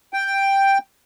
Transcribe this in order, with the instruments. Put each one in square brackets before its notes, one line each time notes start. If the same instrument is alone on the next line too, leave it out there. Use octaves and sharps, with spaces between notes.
[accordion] G5